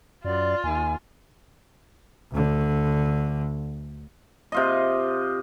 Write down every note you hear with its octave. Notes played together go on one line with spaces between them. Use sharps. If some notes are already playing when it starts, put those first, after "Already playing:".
F#2 F4 D5
D#2 G#5
D2 D3
C3 F4 D#5